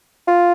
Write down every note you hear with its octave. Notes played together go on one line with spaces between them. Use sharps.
F4